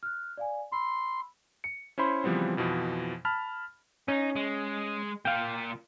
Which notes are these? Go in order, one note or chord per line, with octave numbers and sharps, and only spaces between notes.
F6 F#6
D5 F5 G#5
B5 C6 E6
C#7
C#4 E4 C5 B5 C6
C#3 E3 F3 G3 B3 C4
F2 B2 E3 F3
A5 B5 F6
C#4 D#4
G#3
A#3 F4 F5 G5